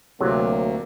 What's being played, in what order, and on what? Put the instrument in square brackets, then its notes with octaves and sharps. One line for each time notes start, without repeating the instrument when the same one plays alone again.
[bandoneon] D2 [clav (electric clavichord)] C3 F#3 [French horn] A#3 [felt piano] G4